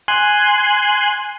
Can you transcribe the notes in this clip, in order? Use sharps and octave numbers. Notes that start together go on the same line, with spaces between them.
G#5 C6 F#6